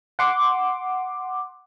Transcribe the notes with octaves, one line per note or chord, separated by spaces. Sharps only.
F#5 C6 D6